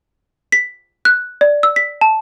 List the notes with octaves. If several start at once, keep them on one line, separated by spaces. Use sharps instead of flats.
B6
F#6
D5
E6
B6
A5